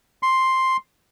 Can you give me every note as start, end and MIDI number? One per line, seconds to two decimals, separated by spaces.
0.23 0.77 84